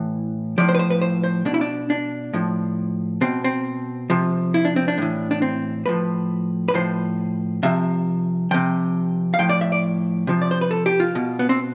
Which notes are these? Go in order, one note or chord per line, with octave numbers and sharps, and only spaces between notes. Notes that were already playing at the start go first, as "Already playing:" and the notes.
Already playing: A2 E3
A2 F3 D5
C5
B4
C5
B4
C5
C5
B2 D4
E4
D4
D4
A2 F3
B2 C4
C4
C3 F3
E4
D4
C4
D4
A2 E3
D4
C4
A2 F3 B4
B4
A2 F3 C5
C3 F3 E5
C3 F3 G5
F5
A2 F3 G5
D5
E5
D5
C3 F3
D5
C5
B4
A4
G4
F4
B2
B3
C4